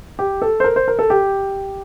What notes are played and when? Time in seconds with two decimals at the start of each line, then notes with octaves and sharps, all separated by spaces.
0.19 G4
0.42 A4
0.60 C5
0.64 A#4
0.76 C5
0.88 A#4
0.99 A4
1.10 G4